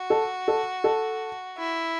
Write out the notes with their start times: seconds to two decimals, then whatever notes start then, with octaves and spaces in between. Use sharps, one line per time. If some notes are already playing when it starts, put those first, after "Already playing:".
Already playing: F#4
0.10 A4
0.48 A4
0.84 A4
1.58 E4